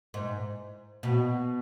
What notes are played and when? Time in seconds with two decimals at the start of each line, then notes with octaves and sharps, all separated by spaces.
0.14 G#2
1.03 B2